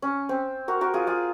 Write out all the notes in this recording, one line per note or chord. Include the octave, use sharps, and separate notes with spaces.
C#4
C4
F#4 A#4
F#4 A#4
F4 G#4
F4 G#4